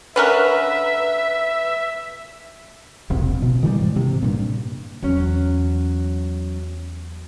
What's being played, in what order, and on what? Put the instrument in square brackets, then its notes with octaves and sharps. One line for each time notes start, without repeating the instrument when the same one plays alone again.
[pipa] D3 C#4 A#4 [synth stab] B4 [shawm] E5
[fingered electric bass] E1 A#1 C3
B2
D#3 E3 F#3 G3
G#2
C3
G2 A#2
[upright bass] E2 [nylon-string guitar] F#3 C#4